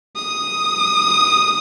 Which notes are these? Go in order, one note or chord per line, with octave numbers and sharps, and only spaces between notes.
D#6